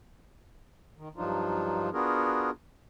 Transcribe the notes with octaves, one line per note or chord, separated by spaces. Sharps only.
D#3
G2 F3 F#3 D4 D#4 F4
B3 D4 F4 F#4 G#4 A#4